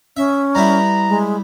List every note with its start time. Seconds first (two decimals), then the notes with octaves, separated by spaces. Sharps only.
0.17 C#4 E5
0.55 G3 B3 E4 A#5
1.09 G#3